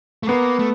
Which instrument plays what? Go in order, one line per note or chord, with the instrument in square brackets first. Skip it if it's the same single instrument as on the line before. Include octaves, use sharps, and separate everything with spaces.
[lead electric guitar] A3
[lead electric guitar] A#3 [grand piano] B3
[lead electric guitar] A3